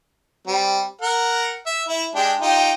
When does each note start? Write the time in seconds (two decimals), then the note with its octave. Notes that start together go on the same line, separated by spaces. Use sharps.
0.47 G3 C4
1.01 A#4 F#5
1.66 E5
1.88 E4
2.15 G#3 D4 G4
2.41 D#4 F4 G4